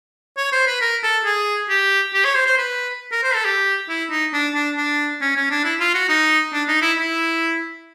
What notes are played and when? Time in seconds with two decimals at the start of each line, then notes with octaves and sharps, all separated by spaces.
0.37 C#5
0.52 C5
0.67 B4
0.81 A#4
1.03 A4
1.25 G#4
1.69 G4
2.14 G4
2.25 C#5
2.35 C5
2.46 C5
2.58 B4
3.12 A#4
3.23 C5
3.34 A4
3.45 G4
3.89 E4
4.11 D#4
4.33 D4
4.54 D4
4.77 D4
5.21 C#4
5.36 C#4
5.50 D4
5.64 E4
5.80 F4
5.94 F#4
6.09 D#4
6.53 D4
6.68 D#4
6.82 E4
6.97 E4